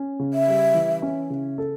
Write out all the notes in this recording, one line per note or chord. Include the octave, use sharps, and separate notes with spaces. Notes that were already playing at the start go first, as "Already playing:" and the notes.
Already playing: C#4
C#3
E5
G3
E3
C#4
C#3
A4